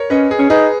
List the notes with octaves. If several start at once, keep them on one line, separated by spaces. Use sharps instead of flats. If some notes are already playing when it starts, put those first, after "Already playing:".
Already playing: A#4 C#5
C#4 B4 D#5
G#4
C#4
D#4 G#4 B4